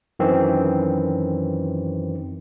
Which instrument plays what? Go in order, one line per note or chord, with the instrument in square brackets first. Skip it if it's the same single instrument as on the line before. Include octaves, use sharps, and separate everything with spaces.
[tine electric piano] F#2 D#3 E3 C4